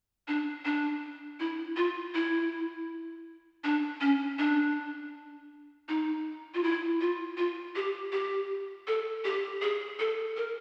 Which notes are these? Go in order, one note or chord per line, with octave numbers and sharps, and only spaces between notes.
D4
D4
E4
F4
E4
D4
C#4
D4
D#4
F4
E4
F4
F4
G4
G4
A4
G4
G#4
A4
A#4